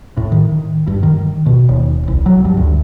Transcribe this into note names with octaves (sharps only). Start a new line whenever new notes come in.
A2
D#3
G2
D#3
B2
D#1
C2
F#3
G2
D2